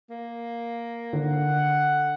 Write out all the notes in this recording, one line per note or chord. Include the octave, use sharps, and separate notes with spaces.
A#3
D3 F#5